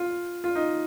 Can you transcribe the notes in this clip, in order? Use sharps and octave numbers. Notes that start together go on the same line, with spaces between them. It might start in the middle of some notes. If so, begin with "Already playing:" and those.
Already playing: F4
F4
D#4